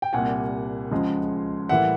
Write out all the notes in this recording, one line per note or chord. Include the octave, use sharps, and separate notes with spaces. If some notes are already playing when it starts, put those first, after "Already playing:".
G5
C2 A#2 G3 A#3 F#5 G#5
C#2 C#3 F3 G#3
A2 E3 G3 A#3 E5 F#5